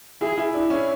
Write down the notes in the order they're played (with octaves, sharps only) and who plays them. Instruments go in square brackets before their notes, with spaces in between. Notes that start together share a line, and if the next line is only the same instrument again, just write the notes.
[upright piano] E4 [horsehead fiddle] G#4
[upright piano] E4
[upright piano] D4 [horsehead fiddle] E4
[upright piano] C#4